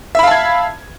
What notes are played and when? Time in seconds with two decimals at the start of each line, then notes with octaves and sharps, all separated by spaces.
0.15 E5
0.19 B5
0.23 F5
0.27 A5
0.31 G#6